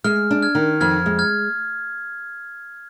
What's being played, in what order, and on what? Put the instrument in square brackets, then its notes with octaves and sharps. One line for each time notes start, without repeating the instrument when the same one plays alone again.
[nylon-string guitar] G#3 [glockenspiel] F6
[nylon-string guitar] D4
[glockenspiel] F6 G#6
[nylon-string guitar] D#3
[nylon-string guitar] F2 [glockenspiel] F6 G#6
[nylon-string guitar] G#3
[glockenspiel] F6 G#6